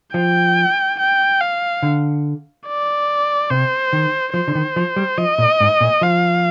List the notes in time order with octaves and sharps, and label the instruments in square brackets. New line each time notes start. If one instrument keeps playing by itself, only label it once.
[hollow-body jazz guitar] F3 [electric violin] G5
[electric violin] G5
F5
[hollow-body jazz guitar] D3
[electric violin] D5
[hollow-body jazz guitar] C3 [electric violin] C5
[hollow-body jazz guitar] D#3
[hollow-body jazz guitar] F3 [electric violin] C5
[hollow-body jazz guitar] D3
D#3
F3
G3
[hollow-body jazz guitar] F3 [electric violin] D#5
[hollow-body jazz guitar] A#2
G#2
A#2
[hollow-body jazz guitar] F3 [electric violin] F5